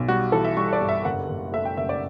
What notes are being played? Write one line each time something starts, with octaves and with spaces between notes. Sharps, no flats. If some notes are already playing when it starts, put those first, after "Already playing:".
Already playing: B1
G3 F#4
E3 A4
E5
G3 C#6
D5
G2
E5
F#1 F#5
F#1
A3 E5
G5
F#1 E5
D5